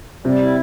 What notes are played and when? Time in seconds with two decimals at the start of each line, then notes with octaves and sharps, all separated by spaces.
0.24 C3 G3
0.41 E4